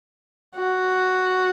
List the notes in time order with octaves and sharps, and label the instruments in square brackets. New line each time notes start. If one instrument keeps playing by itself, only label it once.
[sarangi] F#4